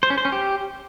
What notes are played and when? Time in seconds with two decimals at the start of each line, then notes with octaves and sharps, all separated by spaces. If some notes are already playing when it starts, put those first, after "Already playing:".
0.03 C5
0.10 C#4
0.18 C5
0.25 C#4
0.32 G4